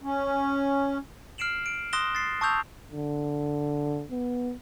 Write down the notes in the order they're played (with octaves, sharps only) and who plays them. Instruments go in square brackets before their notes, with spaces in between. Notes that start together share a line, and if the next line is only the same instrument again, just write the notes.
[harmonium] C#4
[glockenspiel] F6 C7 D7 E7 F#7
D7
C6 D#6 F#6 A#6 E7 G7
A6 C7
A5 C#6 D#6 E6 G6 F7
[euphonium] D3
B3